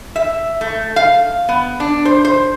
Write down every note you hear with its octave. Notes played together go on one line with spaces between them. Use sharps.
E5
A3
F5
B3
D4
C5
C5